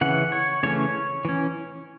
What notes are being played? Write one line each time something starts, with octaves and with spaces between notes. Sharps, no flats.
C#3 E3 C#4 F#5
C#5
C#3 E3 A3 C#4 C#5
E3 C#4